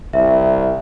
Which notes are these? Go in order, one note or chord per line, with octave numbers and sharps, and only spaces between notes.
C2 E5